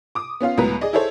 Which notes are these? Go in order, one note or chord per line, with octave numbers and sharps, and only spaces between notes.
D6 D#6
B3 C#4 F4 F5
C#2 A2 F#3 B3 B4 A#5
G#4 D5 D#5
E4 G#4 A4 C5 C#5